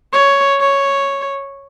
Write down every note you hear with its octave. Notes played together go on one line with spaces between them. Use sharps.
C#5
C#5